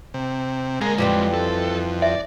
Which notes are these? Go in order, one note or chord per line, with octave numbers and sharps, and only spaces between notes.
C3
D3 G#3 A#3 G#4 A#4
F2 E3 G3 C4
A4
D5 E5